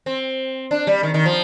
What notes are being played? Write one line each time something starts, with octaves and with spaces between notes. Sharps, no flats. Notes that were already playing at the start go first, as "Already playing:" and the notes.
C4
D4
G3
D#3
D#3
F3